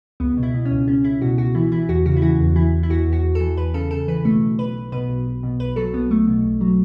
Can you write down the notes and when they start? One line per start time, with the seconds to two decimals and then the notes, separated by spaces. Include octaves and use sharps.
0.20 C#2 B3
0.37 B2
0.43 E4
0.54 B2
0.65 C#4
0.71 C#2
0.87 C#2 C#4
1.04 C#2 E4
1.22 B2 F#4
1.38 C#2 F#4
1.55 E3 E4
1.72 E3 E4
1.89 E2 F#4
2.06 C#3 F#4
2.16 E4
2.22 E3 F#4
2.40 E2
2.56 E3 E4
2.73 E2
2.83 E4
2.90 E2 F#4
3.07 E2
3.13 F#4
3.23 E2
3.35 A4
3.40 E3
3.57 E2 B4
3.74 C#3 A4
3.91 C#3 A4
4.07 E3 B4
4.25 B1 A3
4.42 B1
4.58 B1 B4
4.76 B1
4.92 B2 B4
5.09 B1
5.26 B1
5.43 B2
5.60 B1 B4
5.76 F#3 A4
5.93 B1 B3
6.11 B1 A3
6.27 B2
6.45 B1
6.61 F#3